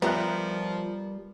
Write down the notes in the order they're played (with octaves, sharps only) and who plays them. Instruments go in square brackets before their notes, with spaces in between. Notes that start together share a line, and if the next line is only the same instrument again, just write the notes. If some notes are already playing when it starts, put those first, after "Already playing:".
[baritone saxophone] F3 [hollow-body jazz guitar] G3 G4 [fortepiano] B3 E5 F#6 [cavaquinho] A#4 A#5